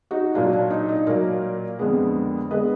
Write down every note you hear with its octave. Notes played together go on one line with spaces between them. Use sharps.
D#4 F#4
A#2 F#3 A#3 D4 F4
D4
D#4
D#4
A#2 F#3 A#3 A#4 D5
F2 D3 G#3 B3
D3 G#3 B3 B4 D#5